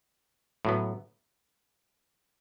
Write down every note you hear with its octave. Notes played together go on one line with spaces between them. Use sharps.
A2 F#3 B3